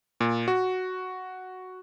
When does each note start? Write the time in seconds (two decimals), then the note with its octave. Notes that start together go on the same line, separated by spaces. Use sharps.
0.21 A#2
0.48 F#4